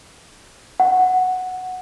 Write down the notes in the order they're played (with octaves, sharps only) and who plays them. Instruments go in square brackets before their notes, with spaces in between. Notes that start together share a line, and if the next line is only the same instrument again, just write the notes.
[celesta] F#5